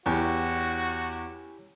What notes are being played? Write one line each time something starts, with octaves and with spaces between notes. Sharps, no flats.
E2 C#4 E4 F#4 G4